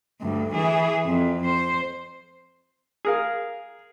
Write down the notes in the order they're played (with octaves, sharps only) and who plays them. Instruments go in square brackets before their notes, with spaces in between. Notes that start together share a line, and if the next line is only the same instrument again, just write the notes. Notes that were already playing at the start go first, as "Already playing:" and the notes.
[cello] D2 G2
E3 G#4
F2
C5
[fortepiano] G#4 A#4 F5